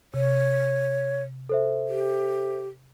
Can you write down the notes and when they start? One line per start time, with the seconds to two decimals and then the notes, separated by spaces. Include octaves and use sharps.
0.14 C3 C#5
1.49 A4 C5 E5
1.88 G4